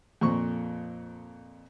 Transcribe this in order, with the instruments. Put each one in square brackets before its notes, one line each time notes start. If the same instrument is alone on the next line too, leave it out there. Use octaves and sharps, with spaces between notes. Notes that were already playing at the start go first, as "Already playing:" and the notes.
[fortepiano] F2 A#2 C#6